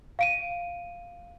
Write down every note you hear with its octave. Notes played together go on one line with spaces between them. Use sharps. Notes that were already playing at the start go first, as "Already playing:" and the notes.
F5 D7 D#7